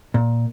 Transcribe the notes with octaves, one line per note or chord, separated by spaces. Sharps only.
A#2